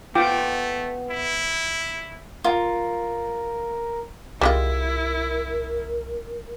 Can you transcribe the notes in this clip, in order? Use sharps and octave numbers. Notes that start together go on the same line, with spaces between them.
A3 B3 F4 G5 D6
E4
F4 A#4
C2 G3 G#3 E4 F4 A#4